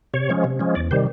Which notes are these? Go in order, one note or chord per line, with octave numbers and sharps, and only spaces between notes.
C3 C#5
F3 G#3 C#4
C3
F3 G#3 C#4
E2 D5
C3 D#3 G3 C5